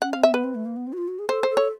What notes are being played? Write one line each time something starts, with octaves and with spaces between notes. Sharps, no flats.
C#4 F#5
F5
C4
E5
B3 B4
C4
A3
A#3
B3
C4
F#4
F4
F#4
G#4
A4 C5
C5
A4
C#5